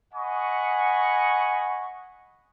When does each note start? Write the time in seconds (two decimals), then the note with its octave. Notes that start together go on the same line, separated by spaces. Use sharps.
0.14 D#5 F#5 G#5 B5 C#6